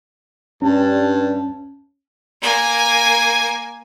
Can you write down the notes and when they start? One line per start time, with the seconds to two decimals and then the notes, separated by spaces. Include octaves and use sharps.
0.62 G2 C#4 A5
2.42 A#3 G#5